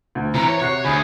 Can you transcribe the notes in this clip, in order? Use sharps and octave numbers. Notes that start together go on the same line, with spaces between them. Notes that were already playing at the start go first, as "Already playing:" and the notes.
D2
C3 E3 A#5
C#5
C3 F#4 C#5 C7
D2 G#4 G#5 B5